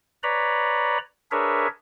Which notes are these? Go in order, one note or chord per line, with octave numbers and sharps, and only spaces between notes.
B4 C#5 D5 A#5 B5
D4 G#4 A#4 B4 C#5 E5